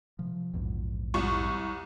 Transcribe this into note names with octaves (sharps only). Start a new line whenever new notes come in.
C3 F3
A#1 E2 G#2
C2 C#6